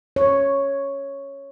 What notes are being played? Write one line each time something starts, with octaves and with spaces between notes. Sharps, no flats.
C#5